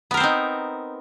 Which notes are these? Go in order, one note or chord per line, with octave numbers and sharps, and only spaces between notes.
B3 C4 D#4 A#4 C5